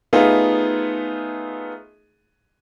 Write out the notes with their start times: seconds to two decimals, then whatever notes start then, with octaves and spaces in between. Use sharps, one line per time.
0.13 A3 B3 D#4 F4 G#4